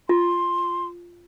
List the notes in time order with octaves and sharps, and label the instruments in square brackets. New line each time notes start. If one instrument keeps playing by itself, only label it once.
[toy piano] F4 [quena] C6